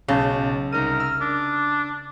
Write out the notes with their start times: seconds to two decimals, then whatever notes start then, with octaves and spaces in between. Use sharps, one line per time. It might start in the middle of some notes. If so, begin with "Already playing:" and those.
0.08 B1 C#3 A5 G6
0.73 C2 D#4 A#4 D#7
1.00 E6
1.21 D4